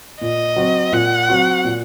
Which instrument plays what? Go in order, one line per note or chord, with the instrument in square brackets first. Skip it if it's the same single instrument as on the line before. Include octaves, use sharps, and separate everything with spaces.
[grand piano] A#2 [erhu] D#5
[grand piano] F#3 C4 F#4
[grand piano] A#2 [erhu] F#5
[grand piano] F#3 C4 F#4
A#2